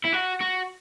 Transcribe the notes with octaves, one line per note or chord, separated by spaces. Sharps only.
E4
F#4
F#4